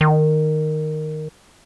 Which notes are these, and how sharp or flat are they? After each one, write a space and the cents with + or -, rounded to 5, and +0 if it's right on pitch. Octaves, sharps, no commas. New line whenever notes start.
D#3 -10